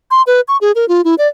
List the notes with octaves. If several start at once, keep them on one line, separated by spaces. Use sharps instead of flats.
C6
B4
C#6
G#4
A#4
F4
E4
D5